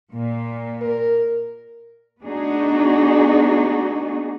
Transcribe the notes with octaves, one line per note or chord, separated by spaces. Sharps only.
A#2
A#4
A3 B3 D4 D#4 F#4 G#4